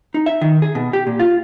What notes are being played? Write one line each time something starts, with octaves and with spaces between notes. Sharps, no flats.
D#4
E5
D#3
G#4
B2
G4
A#2
F4